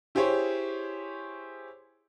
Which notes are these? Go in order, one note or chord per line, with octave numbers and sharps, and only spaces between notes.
E4 G4 G#4 C5 C#5